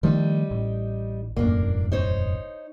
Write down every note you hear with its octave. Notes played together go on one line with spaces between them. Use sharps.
D#3 F3 G3 A3 D#4
A1
E1 A1 F#2 A#3 D4
D#4 C5 C#5